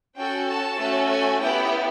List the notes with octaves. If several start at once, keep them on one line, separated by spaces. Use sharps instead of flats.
C#4 F#4 A4 G5
A5
A3 C#4 F#4 A4
G#5
B3 E4 G4 G5